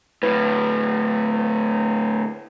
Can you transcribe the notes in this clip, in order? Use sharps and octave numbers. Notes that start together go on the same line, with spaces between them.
D2 A2 B4